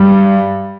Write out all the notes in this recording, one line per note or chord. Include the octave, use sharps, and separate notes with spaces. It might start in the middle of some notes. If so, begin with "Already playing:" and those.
Already playing: G2 G3